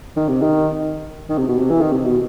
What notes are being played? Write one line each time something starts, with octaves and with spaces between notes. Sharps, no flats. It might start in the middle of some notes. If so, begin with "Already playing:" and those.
D#3
C3
D#3
D#3
C3
B2
C3
E3
D#3
C3
B2